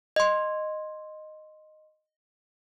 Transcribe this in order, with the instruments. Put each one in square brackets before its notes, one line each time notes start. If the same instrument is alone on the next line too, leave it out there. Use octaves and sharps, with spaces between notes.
[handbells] D#5 C6